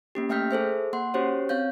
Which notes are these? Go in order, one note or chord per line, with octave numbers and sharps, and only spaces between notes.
A#3 C#4 G4
A3 E5 G5 F6 G6 B6
G#4 A4 C5 E5
A#3 F#5 C6
C#4 F#4 G4 C5 C#5
C4 C#5 F5 G6